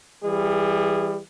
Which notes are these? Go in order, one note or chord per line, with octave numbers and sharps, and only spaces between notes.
E3 G3 G#4